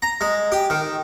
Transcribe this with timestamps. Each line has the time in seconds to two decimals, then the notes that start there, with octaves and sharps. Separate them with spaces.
0.02 A#5
0.21 G#3
0.52 G4
0.70 D#3